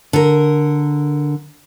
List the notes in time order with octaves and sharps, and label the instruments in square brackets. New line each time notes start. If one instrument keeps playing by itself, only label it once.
[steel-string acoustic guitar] D3 A#4